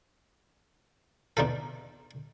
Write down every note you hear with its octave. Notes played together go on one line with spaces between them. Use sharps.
B2 D4 D#4 F4 A4